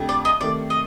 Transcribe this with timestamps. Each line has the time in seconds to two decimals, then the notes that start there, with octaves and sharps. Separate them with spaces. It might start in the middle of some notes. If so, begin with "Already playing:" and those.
Already playing: F2 D3 A3 D4 G4
0.09 D5
0.25 D#5
0.40 C3 D#3 A3 D5
0.70 D#5